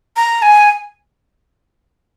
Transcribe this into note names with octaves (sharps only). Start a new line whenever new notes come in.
A#5
G#5